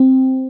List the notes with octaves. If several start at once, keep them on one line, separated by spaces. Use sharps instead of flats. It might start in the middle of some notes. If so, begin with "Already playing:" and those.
Already playing: C4